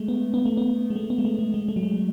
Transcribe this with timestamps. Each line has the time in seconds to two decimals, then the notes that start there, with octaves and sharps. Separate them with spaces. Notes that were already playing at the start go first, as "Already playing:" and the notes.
Already playing: G#3 A3
0.08 B3
0.34 B3
0.45 A3
0.57 B3
0.90 G#3
0.96 A3
1.10 B3
1.18 G#3
1.25 A3
1.39 A3
1.54 G#3
1.69 A3
1.76 F#3
1.83 G#3